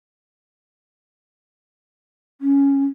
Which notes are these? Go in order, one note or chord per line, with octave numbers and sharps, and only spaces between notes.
C#4